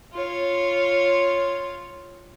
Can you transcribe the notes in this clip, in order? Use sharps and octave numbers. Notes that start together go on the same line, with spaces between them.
F4 C#5